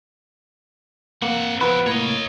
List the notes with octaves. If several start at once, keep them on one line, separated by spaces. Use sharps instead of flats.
A#3 C4 F#5
F3 B3 E4 G4 B4
A2 A#3 C#5 D#5